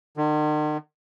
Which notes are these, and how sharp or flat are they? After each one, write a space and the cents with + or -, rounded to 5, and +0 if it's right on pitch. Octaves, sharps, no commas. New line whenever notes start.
D#3 -45